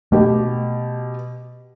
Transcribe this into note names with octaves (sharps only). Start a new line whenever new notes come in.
B2 A3 G4